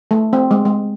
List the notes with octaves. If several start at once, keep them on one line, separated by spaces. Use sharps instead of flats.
A3
C4
G#3
G#3